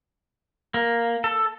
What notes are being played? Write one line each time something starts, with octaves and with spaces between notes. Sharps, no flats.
A#3
A4